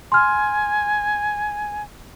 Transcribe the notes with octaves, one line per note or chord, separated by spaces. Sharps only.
G#5 C6 F6